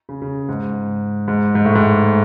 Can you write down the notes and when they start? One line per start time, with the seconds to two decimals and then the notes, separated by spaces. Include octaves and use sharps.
0.09 C#3
0.22 C#3
0.49 G#2
1.28 G#2
1.55 G#2
1.65 A2
1.75 G#2